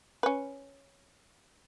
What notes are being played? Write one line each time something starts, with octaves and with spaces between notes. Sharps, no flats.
C#4 B4